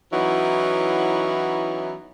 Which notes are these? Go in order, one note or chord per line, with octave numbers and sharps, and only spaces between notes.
E3 F#3 B3 C#4 D#4 E4